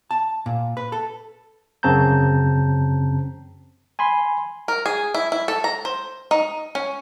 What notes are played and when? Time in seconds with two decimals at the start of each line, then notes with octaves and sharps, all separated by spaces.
0.11 A5
0.46 A#2
0.77 B4
0.92 A4
1.83 F#2 C#3 C4 A5 A#5 G6
3.99 G#5 B5 C6
4.68 A#4
4.86 G#4
5.14 E4
5.32 E4
5.48 A4
5.64 A#5
5.85 C5
6.31 D#4
6.75 C#4